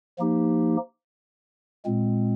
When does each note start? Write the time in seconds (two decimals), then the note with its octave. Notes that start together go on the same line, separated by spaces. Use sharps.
0.19 F3 A#3 D#4 G4
1.85 A#2 G#3 C4